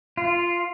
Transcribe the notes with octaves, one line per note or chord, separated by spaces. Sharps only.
F4